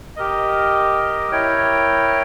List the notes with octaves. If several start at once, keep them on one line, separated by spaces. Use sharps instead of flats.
G4 A#4 D#5
E4 A#4 C#5 G5